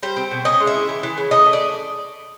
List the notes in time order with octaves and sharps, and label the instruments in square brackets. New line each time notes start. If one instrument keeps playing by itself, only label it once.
[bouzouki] G3 C5
C4
B2
C#4 D#5
G#3
E5
E4
E3
E3
C#3
A3 D#5
A3
D5